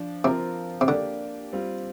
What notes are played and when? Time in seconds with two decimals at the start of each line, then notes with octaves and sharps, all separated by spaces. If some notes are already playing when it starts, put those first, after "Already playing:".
Already playing: F3 D4
0.24 C3 F3 C4 F4 A#4
0.81 C3
0.88 D3 A#3 D4 G4 D5
1.53 G3 C4 F4